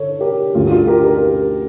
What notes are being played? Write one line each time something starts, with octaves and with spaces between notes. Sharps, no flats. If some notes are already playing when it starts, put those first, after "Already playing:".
Already playing: D3 A4 C#5
G4 A#4
D2 D3 A3 F4 A4
F4 A4
G4 A#4
G4 A#4